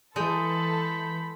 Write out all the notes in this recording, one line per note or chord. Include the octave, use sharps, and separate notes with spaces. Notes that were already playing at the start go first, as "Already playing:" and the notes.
E3 G#3 A4 B5 G6